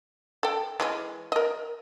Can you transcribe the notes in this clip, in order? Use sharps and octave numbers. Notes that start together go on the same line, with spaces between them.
A4 G5
E3 G#3 C#4
A#4 D#5